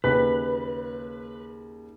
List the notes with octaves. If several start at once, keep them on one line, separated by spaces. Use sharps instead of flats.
D#2 C#3 B4 B6